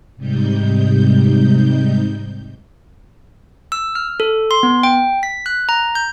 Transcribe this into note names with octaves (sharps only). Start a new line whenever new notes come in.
G#2 C3 G3 D#4 G6
E6
F6
A4
C6
B3
G5
B6
F#6
A#5
G6